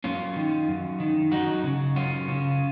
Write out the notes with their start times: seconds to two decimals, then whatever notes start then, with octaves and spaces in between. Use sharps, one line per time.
0.04 F#2 C#4 F4
0.36 D#3
0.68 F#2
1.00 D#3
1.31 F#2 D#4 F#4
1.64 C#3
1.96 F#2 C#4 F4
2.28 C#3